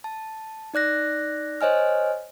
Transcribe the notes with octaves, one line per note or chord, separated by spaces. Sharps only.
A5
D#4 D5 F#6 A#6
C5 C#5 D#5 G#5 F6